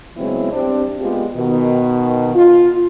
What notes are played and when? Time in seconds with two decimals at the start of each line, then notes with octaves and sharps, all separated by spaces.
0.17 C#3 F#3 G#3 B3 C4 E4
0.53 G3 C4 D4
1.00 G#3 A#3 B3 F4 G4
1.37 B2 D#3
2.35 F4